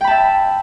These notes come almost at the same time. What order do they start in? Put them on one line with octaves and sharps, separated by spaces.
G5 B5 A5 E5